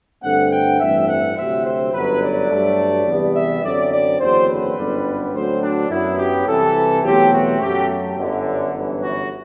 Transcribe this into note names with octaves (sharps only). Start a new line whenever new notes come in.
G2 D3 A3 C4 F#5
G5
A1 G2 E3 A3 C4 E5
F#5
D2 C3 F#3 C4 E5
C5
G1 F#2 F#3 B4
D5
G2 F#3 A3
E2 C3 G3 B3
E5
F#2 D3 F#3 C4 D5
D5
F#1 E2 D3 F#3 C4 C5
B4
G1 F#2 D3 G3 B3
D2 D3 F#3 C4 C5
D4
F#2 F#3 B3 E4
G4
C2 C3 E3 A4
E2 B2 F#3 A3 C4 G4
F#4
F#2 F#3 A3 G4
G1 F#2 D3
G1 F#2 E3 B3
F#4